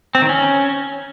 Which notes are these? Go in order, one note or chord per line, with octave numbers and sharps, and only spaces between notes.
C4
D#3
C#4